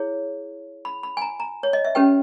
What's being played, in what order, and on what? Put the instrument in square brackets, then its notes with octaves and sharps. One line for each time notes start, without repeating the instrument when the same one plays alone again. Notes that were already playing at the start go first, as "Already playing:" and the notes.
Already playing: [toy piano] E4 G#4 C#5
B5
B5
G#5
A#5
A#5
C#5
D#5
E5
C#4 G4 B4 G5